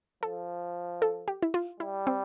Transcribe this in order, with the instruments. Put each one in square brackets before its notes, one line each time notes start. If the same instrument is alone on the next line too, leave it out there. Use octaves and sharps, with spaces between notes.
[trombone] F3 [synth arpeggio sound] A4
[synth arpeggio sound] A4
G4
E4
F4
[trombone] G3 [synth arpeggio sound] E4
[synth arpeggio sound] C4